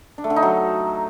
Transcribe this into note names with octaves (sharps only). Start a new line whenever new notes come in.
D4
A3
D3
D#4
F#3